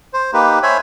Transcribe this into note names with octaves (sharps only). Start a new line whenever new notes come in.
C5
A#3 D#4 G4 B4
C5 C#5 E5 G#5 B5